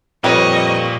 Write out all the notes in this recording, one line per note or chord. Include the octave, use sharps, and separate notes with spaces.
F2 A#2 G3 B4 C#5 D#5 C#6